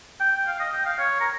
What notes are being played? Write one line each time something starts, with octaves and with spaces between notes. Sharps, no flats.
G5
F5
D#5
G5
F5
C#5
A#4